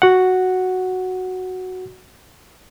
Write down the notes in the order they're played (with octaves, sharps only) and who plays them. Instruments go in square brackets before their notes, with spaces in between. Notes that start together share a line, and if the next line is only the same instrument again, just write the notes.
[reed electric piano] F#4 F#5